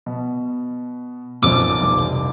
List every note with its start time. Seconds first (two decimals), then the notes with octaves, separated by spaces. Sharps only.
0.06 B2
1.43 B1 F#2 F3 D6
1.81 F1 C2